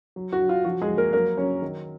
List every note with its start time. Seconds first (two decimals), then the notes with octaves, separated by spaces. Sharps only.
0.16 F#3
0.32 F#4
0.41 F#3
0.49 F4
0.64 F3 F#4
0.81 G#3 G#4
0.89 F3
0.97 A#3 A#4
1.13 F#3 A#3 A#4
1.37 F#3 C#4 C#5
1.62 D#3